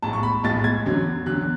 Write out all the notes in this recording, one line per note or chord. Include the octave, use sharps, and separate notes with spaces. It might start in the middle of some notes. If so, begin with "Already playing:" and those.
B1 A2 G#3 A5
C#6
B5
B1 A2 G#3 A6
G#6
E2 D3 F#3
E2 D3 F#3 F#6